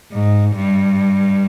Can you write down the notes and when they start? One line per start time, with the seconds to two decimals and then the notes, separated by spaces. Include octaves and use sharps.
0.13 G#2
0.56 G2